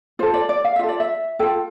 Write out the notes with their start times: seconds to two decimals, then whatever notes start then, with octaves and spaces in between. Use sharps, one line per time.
0.19 F4 A4 C5
0.34 D5
0.49 D5
0.64 F5
0.76 E5
0.79 F4 A4
0.89 D5
1.00 E5
1.39 F4 A4 G5